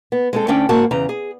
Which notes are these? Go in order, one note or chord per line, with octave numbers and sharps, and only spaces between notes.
B3
G#3 C4 A4
D2 C#4 D4 G5
G#2 A#3 F#4 F#5 A5
E2 C#3 A#5
G#4